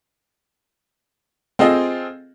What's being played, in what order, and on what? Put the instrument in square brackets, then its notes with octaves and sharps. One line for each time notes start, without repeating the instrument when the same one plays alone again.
[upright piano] C4 F4 G#4 A4 D#5 G5